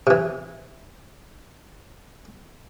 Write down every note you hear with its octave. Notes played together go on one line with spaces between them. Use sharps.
C3 E3